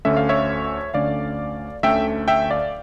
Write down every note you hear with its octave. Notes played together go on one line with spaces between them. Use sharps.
D2 D3 A3 C#4 E5
F5
C#5 E5
D2 D3 A3 C#4 D5 F5
D2 D3 A3 C#4 E5 G5
E5 G5
D5 F5